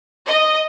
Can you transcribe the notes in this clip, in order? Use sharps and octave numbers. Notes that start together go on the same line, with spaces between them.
D#5